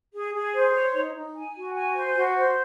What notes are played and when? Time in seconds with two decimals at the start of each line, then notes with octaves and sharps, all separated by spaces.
0.14 G#4
0.34 G#4
0.54 C5
0.74 C#5
0.94 D#4
1.14 D#4
1.35 G#5
1.55 F#4
1.75 G#5
1.95 C5
2.15 F#4
2.35 C5